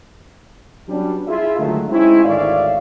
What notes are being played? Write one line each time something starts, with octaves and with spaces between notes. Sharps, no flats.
F#3 G3 B3 C#4 D4
E4 F4 G#4 E5
D3 D#3 F#3 G#3 A3
G#3 C4 C#4 D#4 E4
G#1 D2 C#5 D5 E5 F5